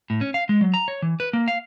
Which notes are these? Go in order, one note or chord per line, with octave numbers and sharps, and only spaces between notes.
A2
C#4
F5
G#3
F#3
A#5
C#5
E3
B4
A#3
F5